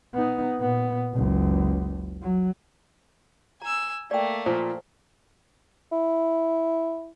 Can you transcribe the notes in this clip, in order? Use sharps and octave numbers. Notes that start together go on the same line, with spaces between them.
B3 D#4
A#2 B3
F#1 C#2
F#3
G#5 A#5 E6
A3 A#3 D5 G5
A#2 F3 C5
E4